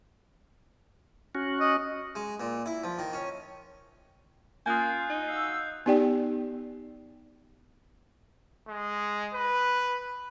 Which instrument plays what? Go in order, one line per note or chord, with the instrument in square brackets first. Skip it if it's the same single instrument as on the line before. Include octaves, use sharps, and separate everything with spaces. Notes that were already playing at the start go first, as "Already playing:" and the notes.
[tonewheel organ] C#4 F#4
[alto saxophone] D#5
[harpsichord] G#3
A#2
E4
F3
D#3
C#4
[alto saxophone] A#3 [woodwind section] C#4 F4 [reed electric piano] G#5 [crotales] D#6 F#6 G6
[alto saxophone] D#4
[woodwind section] F#4 F5 E6 [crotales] C7
[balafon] B3 D#4 G4 D5 G5
[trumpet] G#3
B4